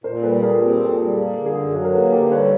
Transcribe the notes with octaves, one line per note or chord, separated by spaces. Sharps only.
A#2 A#4 C5
G3 A4 B4
A#2 G#4 A#4
C4 G4 A4
A#2
A4
G#4
G3
A#3 G#4
D3
G#4
F#2
F#3 G#4
A#4
A#3 A4 B4
D3 G4 A4
G3 B4 C#5